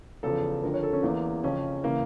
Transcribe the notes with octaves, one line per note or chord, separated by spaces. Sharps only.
E2 C#3 F3 A4
F2 D3 F3 A#4
C#5
A4
C#4
E2 E3 A#3
F2 C#3 F3 C#4
C#3 E3 A#3